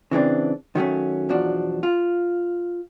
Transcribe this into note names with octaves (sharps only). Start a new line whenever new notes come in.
C#3 E3 C4 D4
D#3 F#3 A3 C#4
B1 E2 F3 D4 F#4
F4